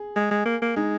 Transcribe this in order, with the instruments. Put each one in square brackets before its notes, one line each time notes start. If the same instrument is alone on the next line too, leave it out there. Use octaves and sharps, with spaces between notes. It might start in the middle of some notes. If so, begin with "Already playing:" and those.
Already playing: [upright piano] G#4
[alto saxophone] G#3
G#3
A#3
A#3
[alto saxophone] G#3 [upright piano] D#4